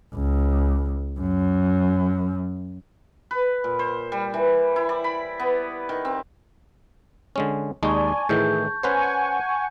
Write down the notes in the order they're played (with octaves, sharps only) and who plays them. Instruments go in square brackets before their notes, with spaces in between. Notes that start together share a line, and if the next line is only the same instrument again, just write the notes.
[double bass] C#2
F#2
[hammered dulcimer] B4
A#2
C5
G3
E3
E4
D5
B5
B3
D#3
C4
[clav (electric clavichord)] D3 G#3 C#4
[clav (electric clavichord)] D#2 G#3 D#4 [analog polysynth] D5 G#5 [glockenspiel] A5 C#6
[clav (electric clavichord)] A2 D#3 E3 [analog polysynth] G#4 [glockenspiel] G6
[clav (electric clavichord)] C#4 B4 C5 [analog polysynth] F#5 G#5 C#6 [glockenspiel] G6